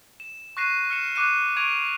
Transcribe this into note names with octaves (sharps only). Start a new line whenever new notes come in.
E7
C#6 F#6 A#6 C7 D#7 E7
F6 C#7 E7
C#6 D6 F#6 C#7 D#7 E7
C#6 G#6 D7 D#7 F7